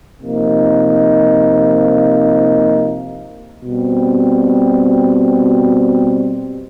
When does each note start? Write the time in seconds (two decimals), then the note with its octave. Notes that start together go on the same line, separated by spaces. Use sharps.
0.21 C3 F3 A#3 D#4
3.63 B2 G3 C4